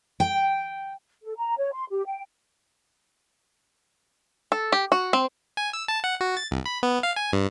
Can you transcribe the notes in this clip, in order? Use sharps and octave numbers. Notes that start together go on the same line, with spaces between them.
G5
A4
A#5
C#5
C6
G4
G5
A4
G4
F#4
C4
G#5
E6
A5
F#5
F#4
A6
C2
B5
B3
F5
G#5
G2